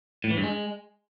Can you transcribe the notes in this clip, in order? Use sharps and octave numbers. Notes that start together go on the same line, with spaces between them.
A2
E3
G2
G#3